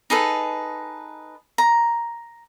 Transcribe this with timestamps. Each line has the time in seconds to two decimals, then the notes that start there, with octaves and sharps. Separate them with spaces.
0.10 D#4 G#4 A4 B4
1.58 A#5